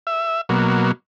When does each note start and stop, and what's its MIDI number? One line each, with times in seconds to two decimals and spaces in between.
0.07 0.41 76
0.49 0.92 47
0.49 0.92 54
0.49 0.92 58